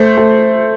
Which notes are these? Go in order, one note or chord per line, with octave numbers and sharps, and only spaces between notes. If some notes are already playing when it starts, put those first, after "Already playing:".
Already playing: A3 C5
A3